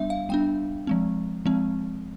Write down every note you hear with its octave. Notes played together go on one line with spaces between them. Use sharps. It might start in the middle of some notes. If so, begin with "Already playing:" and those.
Already playing: G3 B3 D4 E5
F5
G3 B3 D4 G5
F3 G#3 C4
F3 G#3 C4